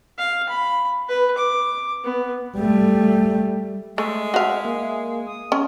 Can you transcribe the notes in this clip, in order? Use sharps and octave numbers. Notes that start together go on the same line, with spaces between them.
F5
B5
B4
D6
B3
G3 A3
G#3 A3 E5
F#4 E5 F5
A#3
D#6
C#4